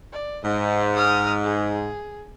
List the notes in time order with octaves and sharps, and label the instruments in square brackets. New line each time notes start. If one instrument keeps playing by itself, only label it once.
[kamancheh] D5
[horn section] G#2 [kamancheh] D#5
[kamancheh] D#6 F6
G#4